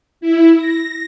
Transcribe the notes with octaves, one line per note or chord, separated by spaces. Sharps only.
E4
A#6